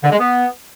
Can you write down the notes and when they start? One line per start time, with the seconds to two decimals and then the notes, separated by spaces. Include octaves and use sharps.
0.04 D3
0.11 G#3
0.19 B3